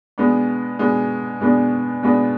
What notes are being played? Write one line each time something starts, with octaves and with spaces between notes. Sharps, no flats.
B2 G#3 B3 D4
B2 G#3 B3 D4
B2 G#3 B3 D4
B2 G#3 B3 D4